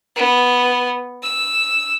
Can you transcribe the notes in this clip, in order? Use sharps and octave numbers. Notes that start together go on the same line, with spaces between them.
B3
E6